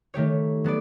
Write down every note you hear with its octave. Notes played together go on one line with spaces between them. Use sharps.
D#3 A3 G4 C#5
F#3 B3 A4 D5